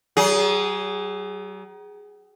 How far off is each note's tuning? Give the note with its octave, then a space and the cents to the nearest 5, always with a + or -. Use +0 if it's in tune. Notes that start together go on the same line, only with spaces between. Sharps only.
F#3 +45 G#4 -5